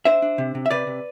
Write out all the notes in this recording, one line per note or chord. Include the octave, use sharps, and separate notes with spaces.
D4 C5 E5
D4
C3
C3
E5
C3 B4 D5
C3